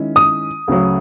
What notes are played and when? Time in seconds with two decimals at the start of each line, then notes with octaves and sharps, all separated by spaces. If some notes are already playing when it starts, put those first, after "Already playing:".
Already playing: D#3 G#3 C#4 E4
0.16 D#6
0.68 D2 C#3 F#3